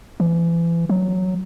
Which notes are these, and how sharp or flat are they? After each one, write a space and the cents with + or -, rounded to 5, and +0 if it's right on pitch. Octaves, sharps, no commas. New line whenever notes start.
E3 +35
F#3 +0